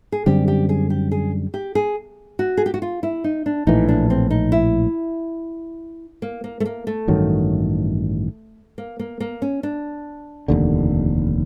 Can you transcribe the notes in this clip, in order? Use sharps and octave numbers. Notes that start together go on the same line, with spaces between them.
G#4
F#2 D3 G3 C4 G4
G4
G#4
G4
G#4
G4
G#4
F#4
G#4
G4
F#4
F4
E4
D#4
D4
A#1 A2 E3 D#4
D4
C4
D#4
E4
A#3
A#3
A3
A#3
A3
A1 G2 D#3 F#3
A#3
A#3
A#3
C#4
D4
F1 D#2 D3